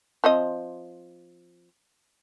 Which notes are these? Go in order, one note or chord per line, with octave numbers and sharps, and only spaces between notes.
F3 C4 D#5